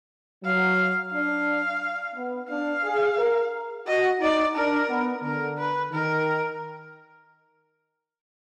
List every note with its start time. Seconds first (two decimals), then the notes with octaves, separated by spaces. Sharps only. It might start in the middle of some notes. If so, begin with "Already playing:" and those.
0.44 F#3 F5
1.12 D4 F5
2.16 B3
2.50 D4 F5
2.84 G#4
3.19 A#4
3.87 F#4 D#5
4.20 D#4 D5
4.55 D4 A#4
4.89 B3
5.24 D3 A#4
5.58 B4
5.92 D#3 A#4